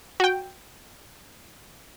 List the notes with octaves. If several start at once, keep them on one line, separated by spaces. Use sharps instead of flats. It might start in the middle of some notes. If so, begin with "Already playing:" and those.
F#4 G5